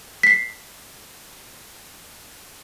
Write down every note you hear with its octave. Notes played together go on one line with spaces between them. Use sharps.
B6 C7